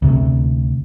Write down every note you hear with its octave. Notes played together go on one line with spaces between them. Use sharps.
D2 C3